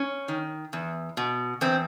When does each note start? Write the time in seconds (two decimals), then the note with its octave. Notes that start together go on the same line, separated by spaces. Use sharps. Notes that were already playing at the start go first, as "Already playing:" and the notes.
Already playing: C#4
0.28 D#3
0.73 E2
1.17 B2
1.61 E2 C4